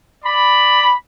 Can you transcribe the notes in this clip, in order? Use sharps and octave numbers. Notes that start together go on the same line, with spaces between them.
D5 B5